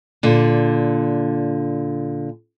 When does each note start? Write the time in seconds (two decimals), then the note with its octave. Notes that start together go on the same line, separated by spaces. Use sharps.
0.23 A#2 D3